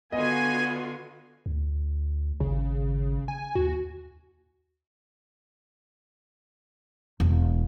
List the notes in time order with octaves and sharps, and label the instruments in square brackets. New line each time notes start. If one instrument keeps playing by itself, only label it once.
[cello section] D3 F4 F#4 [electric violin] B3 [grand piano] D#5 [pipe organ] G#5
[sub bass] D2
[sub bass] G#1 [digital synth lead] C#3
[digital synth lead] G#5
[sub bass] D#2 [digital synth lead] F#4
[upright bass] E1